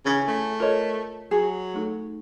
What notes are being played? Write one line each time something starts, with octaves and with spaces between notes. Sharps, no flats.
C#3 E3 C#4
A3
F4 A4 A#4 C#5 D#5
F#3 G#4
A3 D#4 A4